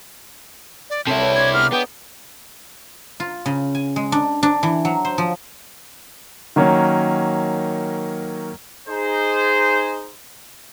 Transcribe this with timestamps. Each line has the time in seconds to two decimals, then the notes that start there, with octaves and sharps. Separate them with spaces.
0.90 D5
1.07 C3 E4 A4 C#5 F#5 A5
1.20 B4 F#5
1.35 D4 E5 G#6
1.54 G#3 B3 A#5 F6
1.72 B3 D#5 G5 C6 D6
3.20 F4
3.46 C#3
3.75 G#5
3.96 G#3
4.12 D4
4.43 D4
4.63 E3
4.85 F#3
5.05 C5
5.18 F3
6.56 D#3 F#3 A#3 C#4
8.88 D#4 G#4 C5